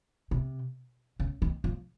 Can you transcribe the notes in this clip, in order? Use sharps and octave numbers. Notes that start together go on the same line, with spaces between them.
C3
C#3
D#3
F3